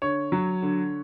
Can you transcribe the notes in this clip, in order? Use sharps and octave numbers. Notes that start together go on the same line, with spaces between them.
D3 C#5
F#3
D3